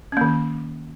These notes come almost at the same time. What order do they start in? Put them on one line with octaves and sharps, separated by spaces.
C#4 A#3 D#3